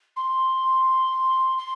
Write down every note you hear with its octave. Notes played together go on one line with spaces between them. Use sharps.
C6
C6